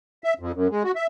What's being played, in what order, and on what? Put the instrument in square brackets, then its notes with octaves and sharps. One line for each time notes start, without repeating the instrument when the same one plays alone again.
[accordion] E5
F2
F#2
G#3
F#4
E5